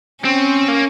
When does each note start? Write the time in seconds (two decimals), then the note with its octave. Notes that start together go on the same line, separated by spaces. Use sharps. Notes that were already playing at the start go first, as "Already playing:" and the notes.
0.25 C4 C#4
0.68 A#3